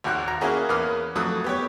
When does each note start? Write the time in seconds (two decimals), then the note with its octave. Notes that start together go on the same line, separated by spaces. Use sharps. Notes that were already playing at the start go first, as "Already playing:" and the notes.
0.04 G#1 D#2 F#4 F#6
0.28 A#5
0.41 A#3 C#4 E4 F#4 G#4 A#4
0.69 E2 A#3 B4 D#6 F6
1.16 F2 F#3 A3 D#6 E6 F#6
1.44 B3 G4 C#5